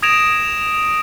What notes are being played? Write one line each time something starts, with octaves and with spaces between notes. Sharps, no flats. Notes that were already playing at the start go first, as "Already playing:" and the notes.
D#6 G#6 A#6 D7 E7 F7